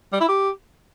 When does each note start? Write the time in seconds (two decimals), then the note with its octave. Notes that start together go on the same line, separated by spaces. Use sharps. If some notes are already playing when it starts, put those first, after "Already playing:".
0.13 G3
0.21 E4
0.29 G4